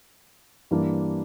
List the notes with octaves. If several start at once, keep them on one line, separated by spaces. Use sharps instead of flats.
G2 E3 A#3 D4